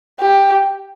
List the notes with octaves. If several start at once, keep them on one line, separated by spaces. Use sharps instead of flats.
G4